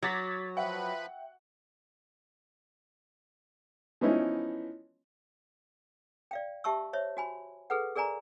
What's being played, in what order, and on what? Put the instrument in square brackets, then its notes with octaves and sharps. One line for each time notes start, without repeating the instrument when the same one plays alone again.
[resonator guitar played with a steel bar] F#3 [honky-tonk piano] F#4 D6 [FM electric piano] G#6 A6 B6
[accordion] F3 B4 B5 [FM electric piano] E5 G5 [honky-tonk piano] F#5
[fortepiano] E3 F3 B3 C#4 D#4 E4
[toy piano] D5 F5 G5
G4 E5 A5 C#6 E6
C5 C#5 E5
F#4 G#5 B5
G#4 A4 B4 F#5
G#4 A#4 D5 G#5 A#5